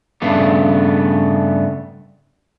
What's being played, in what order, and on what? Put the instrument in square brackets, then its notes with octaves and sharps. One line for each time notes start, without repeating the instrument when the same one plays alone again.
[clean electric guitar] G2 C#3 A3 B3